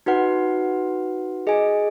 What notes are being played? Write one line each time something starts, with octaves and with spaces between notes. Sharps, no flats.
D#4 F#4 B4 F#5
G#4 D#5 G#5